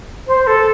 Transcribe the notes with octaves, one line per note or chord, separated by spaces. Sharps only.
C5
A4